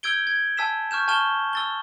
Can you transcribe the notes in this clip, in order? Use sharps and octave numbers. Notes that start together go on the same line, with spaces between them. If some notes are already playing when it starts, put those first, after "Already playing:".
E6 G6 G#6 D7 G7
G#6
G#5 A5 E6 B6 E7
C#6 F6 G6 E7
G#5 A5 C#6 F6 E7 G7
E6 A6 G7